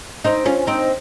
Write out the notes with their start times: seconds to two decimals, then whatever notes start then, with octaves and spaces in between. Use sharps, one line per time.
0.24 C4 D#4
0.46 C#4 F4
0.67 C4 D#4